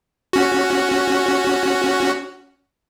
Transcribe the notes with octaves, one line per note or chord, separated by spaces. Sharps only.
C#4 F#4